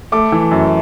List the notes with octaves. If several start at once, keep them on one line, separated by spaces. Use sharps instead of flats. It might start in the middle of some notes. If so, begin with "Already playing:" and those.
A3 D6
E3
F#2